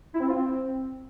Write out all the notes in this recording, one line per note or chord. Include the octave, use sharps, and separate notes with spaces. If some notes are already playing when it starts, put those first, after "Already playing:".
E4
C4
F4
C4